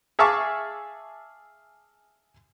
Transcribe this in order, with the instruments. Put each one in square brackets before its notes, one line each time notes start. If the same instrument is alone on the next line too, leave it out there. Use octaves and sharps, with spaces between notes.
[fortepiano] G#4 E5 F5 A5 C#6 D6